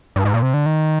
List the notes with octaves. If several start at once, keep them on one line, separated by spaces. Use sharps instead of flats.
G2
G#2
A#2
C3
D3
D#3